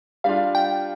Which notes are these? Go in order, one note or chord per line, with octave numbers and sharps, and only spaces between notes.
G3 D4 F4 F5
G5